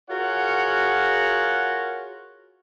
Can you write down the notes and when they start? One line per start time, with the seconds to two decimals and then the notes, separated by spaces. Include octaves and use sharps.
0.10 F4 F#4 G#4 A#4 C#5 F#5